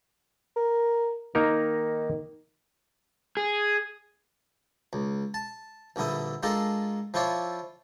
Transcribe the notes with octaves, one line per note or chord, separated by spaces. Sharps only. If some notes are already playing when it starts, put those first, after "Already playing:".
A#4
D#3 A#3 D#4 A#4
G#4
C#2
A5
A#1 G2 D3 E4 D#6
G#3 D4 F4 A4 A#4
F3 E4 F4 C#5 D5